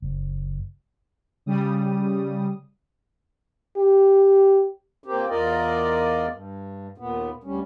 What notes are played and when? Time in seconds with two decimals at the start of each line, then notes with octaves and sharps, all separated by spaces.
0.02 F#1
1.46 C#3 G3 D#6
3.77 G4
5.04 A#2 A#3 C4 G4
5.29 E2 F4 A#4 D5 D#5
6.30 G2
6.98 D#2 A#2 B3
7.44 D2 G3 C#4